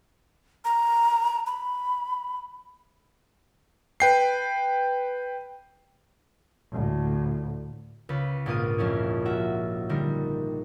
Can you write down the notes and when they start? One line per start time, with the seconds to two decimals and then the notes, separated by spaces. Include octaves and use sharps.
0.65 A#5
1.47 B5
4.00 B4 G5 C7
6.72 D2 A2
8.09 C#2 B4
8.46 A#1 G#2 A#3 F4 D#6 D#7
8.78 F2 C#4 E4
9.25 F4 F#4 E5
9.89 D3 D#3 G3 A#4